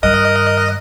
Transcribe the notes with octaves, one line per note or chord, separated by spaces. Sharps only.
G2 D#3 A#4 D#5 F#6